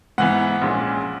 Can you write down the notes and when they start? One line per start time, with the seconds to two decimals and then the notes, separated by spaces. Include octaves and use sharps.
0.18 G#2 E3 B3 F#5
0.62 A#1 A#2 G#3 C#4